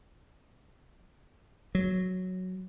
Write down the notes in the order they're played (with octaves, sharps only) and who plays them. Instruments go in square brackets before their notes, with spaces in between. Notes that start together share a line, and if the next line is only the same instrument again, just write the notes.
[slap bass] F#3